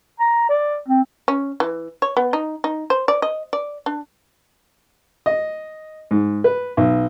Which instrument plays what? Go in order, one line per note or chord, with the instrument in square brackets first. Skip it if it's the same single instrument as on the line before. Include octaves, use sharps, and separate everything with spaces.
[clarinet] A#5
D5
C4
[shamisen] C#4
E3
C#5
B3
D#4
D#4
C5
D5
D#5
D5
D4
[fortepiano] D#5
G#2
B4
B1